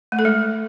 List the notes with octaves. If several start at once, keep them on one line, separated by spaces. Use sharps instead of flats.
A3
A4
G#3